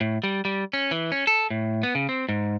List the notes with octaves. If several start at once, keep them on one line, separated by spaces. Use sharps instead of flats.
A2
G3
G3
C#4
E3
C#4
A4
A2
B3
C#3
C4
G#2